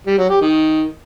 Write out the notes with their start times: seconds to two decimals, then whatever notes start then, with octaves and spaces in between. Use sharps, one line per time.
0.06 G3
0.18 F#3
0.29 G4
0.41 D#3